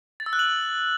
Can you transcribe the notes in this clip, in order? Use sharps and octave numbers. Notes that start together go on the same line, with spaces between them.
A6
E6
F#6
F#7